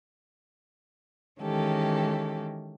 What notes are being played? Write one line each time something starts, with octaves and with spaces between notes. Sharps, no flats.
D#3 E3 G#3 C#4 G4 A4